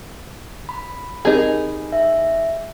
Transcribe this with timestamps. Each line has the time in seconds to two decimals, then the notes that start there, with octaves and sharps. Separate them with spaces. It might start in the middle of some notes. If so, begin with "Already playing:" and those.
0.69 B5
1.25 C4 D#4 G4 G#4 A#4
1.92 E5